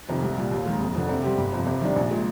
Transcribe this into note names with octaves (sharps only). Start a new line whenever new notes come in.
F2 C3 D#3
C2
A#2 G3
D#2
D#3 G#3
F1
F2 D3
C3
G3 C4 G4
G1
F2 C3
C3
D#3 G3 D4
A#1
A#2 G#3